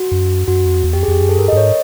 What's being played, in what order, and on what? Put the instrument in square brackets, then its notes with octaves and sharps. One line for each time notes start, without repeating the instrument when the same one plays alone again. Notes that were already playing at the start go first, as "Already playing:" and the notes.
Already playing: [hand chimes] F#4
[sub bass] F#2
[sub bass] F#2 [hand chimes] F#4
[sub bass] F2
E2
[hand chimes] G4
[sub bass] F2
[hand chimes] G#4
[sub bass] F2 [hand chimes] G4
[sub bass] F#2 [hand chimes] G#4
[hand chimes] A4
[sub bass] G2 [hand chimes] A#4
[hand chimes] D#5
[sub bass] G2
[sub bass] G#2 [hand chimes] C#5